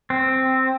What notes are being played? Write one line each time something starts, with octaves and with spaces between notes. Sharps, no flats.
C4